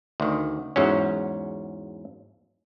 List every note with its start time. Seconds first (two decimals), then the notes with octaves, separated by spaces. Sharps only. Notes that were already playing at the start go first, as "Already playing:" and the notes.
0.20 D2 D#3
0.76 E2 G#2 F#3 C#4